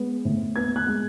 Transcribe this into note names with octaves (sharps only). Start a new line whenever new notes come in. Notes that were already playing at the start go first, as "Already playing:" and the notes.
Already playing: G#3 B3
A2
B3 G#6
F#6
G#3